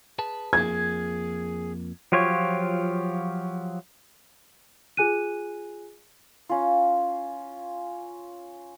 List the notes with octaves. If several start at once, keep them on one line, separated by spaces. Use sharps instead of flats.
G#4 B4 A5
F2 F3 A#3 G#4 G#6
F3 F#3 F4 G4 C#5
F4 G#4 G#5 F#6 D#7
C#4 F4